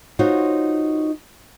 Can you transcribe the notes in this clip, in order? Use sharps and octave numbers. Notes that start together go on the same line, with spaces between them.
D#4 F4 F#4 C5 C#5